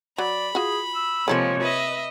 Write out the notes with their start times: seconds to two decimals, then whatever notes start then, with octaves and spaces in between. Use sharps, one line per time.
0.18 F#3 D5 B5
0.55 F4 F#4 G#4
0.95 E6
1.28 C3 F3 G#3 A#3 F4 A4 C#5
1.61 B4 D#5 E5